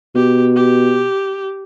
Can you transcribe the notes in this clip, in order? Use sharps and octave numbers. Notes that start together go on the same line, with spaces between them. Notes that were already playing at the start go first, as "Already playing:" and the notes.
B2 G4
G4